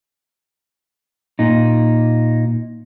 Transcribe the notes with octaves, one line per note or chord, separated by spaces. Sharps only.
A#2 D#4